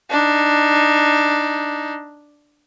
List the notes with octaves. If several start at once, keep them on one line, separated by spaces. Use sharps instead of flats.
D4 D#4